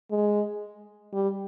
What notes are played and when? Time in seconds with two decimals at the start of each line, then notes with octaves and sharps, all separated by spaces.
0.11 G#3
1.13 G3